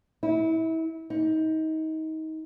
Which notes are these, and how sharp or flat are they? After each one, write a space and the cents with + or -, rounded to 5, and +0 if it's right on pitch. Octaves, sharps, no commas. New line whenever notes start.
E4 -30
D#4 +25